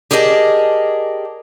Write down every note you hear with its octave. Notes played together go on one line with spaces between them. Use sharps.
G4 G#4 A#4 D5 D#5 A5